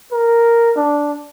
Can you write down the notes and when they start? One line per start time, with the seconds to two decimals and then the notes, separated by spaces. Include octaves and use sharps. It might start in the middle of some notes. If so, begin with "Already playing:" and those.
0.12 A#4
0.76 D4